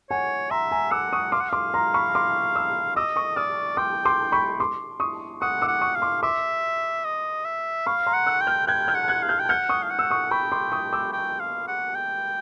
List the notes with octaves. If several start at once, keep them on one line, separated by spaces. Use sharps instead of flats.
C#5 F#5 G#5
E5 A#5 C6
G#5 A#5
F#5 D6 E6
C#6 D#6
F5 C6 D6
F#5
F5 C6 D6
A#5 C6
B5 C#6
C6 D6
D6 E6
D#5 D6 E6
C#6 D#6
D5 D#6 F6
G5 C6 D6
C6 D6
B5 C#6
C6 D6
C#6 D#6
F#5 C#6 D#6
D6 E6
F#5
C#6 D#6
F5
C6 D6
E5 C6 D6
D#5
E5
F5 B5 C#6
A#5 C6
F#5
E6 F#6
G5
F6 G6
G5 F#6 G#6
F6 G6
F#5
F#6 G#6
F5
F6 G6
G5
F#5 F6 G6
C#6 D#6
F5
F#5
E6
C#6 D#6
G5 B5 C#6
C6 D6
C#6 D#6
D6 E6
G5
F5
F#5
G5